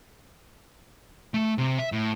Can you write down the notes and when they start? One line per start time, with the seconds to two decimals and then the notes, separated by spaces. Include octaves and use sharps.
1.34 A3
1.58 C3
1.78 E5
1.92 A2